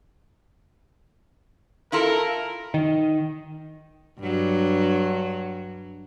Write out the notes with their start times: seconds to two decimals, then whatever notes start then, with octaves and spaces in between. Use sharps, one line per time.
1.92 E4 F4 A4 A#4
2.74 D#3
4.19 G2 F#3